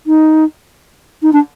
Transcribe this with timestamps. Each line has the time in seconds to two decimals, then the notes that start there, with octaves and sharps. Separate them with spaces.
0.07 D#4
1.22 D#4
1.33 D4